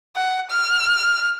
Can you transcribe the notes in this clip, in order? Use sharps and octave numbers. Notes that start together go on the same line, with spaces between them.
F#5
F6